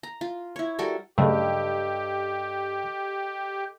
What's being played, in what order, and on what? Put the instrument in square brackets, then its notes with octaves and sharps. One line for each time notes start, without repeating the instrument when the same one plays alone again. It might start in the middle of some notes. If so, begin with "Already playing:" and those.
[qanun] A#5
F4
E4 C#5
G3 F#4 A4 A#4
[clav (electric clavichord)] G2 [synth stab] C#3 F#3 A3 [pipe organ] G4 [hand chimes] A4 D#5 E6